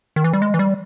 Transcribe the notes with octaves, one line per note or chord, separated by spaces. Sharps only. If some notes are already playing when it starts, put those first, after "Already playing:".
D#3
E3
G3
G#3
E3
G3